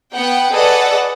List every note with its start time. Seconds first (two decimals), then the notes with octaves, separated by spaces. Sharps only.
0.13 B3 F#5 G5
0.52 G#4 A4 B4 D5 D#5 F#5